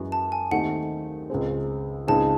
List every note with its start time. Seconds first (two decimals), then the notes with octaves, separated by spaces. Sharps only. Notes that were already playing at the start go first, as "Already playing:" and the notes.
Already playing: F#2 E3 G#3 C#4 F#4
0.12 A5
0.32 G#5
0.51 D#2 D#3 A3 C4 D#4 F#5
1.30 C#2 C#3 G#3 C4
2.08 C#2 C#3 G#3 C4 D#4 A5